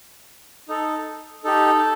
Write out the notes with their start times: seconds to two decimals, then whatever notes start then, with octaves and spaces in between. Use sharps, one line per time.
0.68 D#4 A4
1.44 D#4 G4 A4